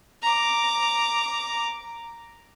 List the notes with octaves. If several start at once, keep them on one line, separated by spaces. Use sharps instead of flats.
A#5 D6